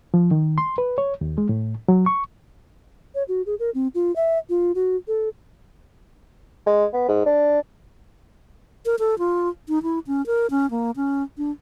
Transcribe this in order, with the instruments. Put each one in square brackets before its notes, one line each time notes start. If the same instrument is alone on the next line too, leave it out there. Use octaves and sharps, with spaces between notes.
[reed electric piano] F3
D#3
C6
B4
C#5
D#2
G#3
A2
F#3
C#6
[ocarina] C#5
F#4
G#4
A#4
C4
F4
E5
F4
F#4
A4
[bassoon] G#3
B3
G#2
D4
[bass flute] A#4
A4
F4
D#4
E4
C#4
A#4
C#4
A#3
C#4
D4